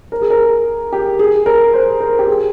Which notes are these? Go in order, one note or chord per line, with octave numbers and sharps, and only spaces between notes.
A#4
G#4
A#4
G4
G#4
A#4
C5
A#4
G4
G#4